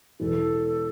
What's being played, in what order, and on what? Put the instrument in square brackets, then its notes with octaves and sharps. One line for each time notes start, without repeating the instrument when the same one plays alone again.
[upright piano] E1 E2 E3 [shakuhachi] A4